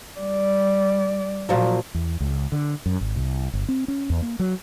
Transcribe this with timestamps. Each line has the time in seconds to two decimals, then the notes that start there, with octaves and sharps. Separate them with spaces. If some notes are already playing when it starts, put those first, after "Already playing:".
0.19 G3 D5
1.49 A#2 F3 F#3
1.94 E2
2.20 C#2
2.52 D3
2.86 F#2
3.01 G#1
3.16 C2
3.53 G1
3.69 C4
3.88 C#4
4.10 E2
4.22 A#3
4.39 F#3